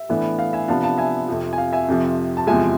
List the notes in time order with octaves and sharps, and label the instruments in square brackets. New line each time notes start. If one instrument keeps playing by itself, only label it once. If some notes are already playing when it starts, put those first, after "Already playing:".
Already playing: [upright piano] E5
A2 E3 B3 D4
F5
E5 G#5
C3 F3 B3 D4 F5 A5
F5 A5
E5 G#5
F2 C3 F3
G#5
F5
E5 G#5
F2 C3 F3
A5
E2 C3 F3 G#3 E5 G#5